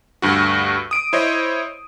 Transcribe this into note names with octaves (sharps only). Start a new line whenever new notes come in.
D2 G2 F#4
D#6 D7
E4 C5 C#5 D#5